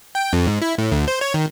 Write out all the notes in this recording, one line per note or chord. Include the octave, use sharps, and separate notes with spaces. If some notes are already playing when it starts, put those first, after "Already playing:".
G5
F2
G#2
E4
A2
D2
C5
C#5
D#3